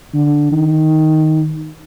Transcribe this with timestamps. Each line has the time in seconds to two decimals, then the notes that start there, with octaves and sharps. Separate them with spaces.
0.14 D3
0.51 D#3